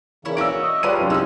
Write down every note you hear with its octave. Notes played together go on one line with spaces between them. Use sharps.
C#3 E3 A#3 E4 C#5
C#4 F#4 E6 D7
D#5 E5
C#3 F3 G3 D4 F4 B4 D#7
F1 F#2
C2 G#3 C#4 D#4 E6